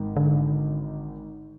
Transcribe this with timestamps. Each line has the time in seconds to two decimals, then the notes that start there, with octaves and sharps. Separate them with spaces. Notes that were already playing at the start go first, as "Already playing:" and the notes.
Already playing: G#1 G#2 D#3
0.16 D3